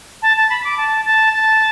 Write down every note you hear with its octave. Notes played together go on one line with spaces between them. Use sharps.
A5
A5
B5
D6
A5
A5
A5